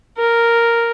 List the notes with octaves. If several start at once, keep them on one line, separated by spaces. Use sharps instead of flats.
A#4